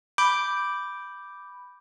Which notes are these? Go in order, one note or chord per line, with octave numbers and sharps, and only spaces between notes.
B5 D6 G6 D7